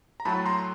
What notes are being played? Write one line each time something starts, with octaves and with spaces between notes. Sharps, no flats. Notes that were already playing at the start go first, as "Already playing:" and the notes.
A#5
A2 F#3 A3 A5 B5
A#5 C6